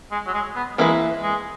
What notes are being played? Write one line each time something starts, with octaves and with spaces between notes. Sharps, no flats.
G#3
F#3
G#3
B3
E3 G#3 A#3 E4 B4
G#3